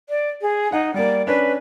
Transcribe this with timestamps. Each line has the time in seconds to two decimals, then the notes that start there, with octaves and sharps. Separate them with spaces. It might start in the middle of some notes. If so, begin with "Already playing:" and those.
0.09 D5
0.42 G#4
0.72 D#4 F#5
0.94 G3 A#3 D5
1.27 C#4 D4 B4